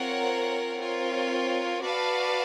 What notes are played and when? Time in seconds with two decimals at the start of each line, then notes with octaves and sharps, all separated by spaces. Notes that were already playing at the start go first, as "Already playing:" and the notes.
Already playing: C4 F4 A#4 C#5 F#5
0.78 C4 F4 A#4 C#5
1.82 F#4 B4 D5 F5 A5